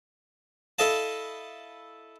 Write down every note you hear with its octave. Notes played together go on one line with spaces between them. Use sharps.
E4 A4 D#5 F5 A5